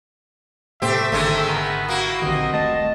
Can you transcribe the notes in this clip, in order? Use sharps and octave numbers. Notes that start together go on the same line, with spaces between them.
A2 C3 A3 A#3 G4 C5 E5
G#1 D3 D#3 G#3 A3
B3 A#4 A#5
A#3 E4 F#4
A#1 D3 D#3 C4 G4 D#5
D#1 A3 D#5 A5